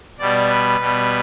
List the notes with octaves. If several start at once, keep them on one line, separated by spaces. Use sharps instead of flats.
B2 G3 D5
B4
B2 G3